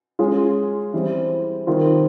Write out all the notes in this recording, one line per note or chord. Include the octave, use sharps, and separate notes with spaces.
G#3 C#4 F4 G#4
E3 G3 C4
C3 D#3 G3 C4 F4